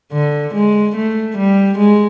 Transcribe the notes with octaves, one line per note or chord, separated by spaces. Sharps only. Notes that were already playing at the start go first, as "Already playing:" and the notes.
D3
G#3
A3
G3
G#3